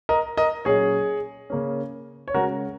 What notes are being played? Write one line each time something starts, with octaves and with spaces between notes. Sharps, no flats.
A#4 D#5
A#4 D#5
A#2 F#3 C#4 G#4 C#5
C#3 A#3 C#4
C#5
C#3 G#3 C#4 F#4 A#4